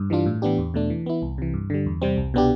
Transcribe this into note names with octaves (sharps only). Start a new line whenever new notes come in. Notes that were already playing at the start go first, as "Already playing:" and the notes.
Already playing: G2
E3 G3 D4 F4
A2
E3 B3 D4 G4
E2
B2 A3 D4
E3
B3 E4
C2
C3 E3
G2
D3 G3
E2
C3 G3 C4
C2
B2 B3 D4 G4